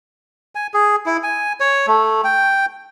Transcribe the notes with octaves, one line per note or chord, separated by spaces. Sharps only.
G#5
G#4
E4
G#5
C#5
A3
G5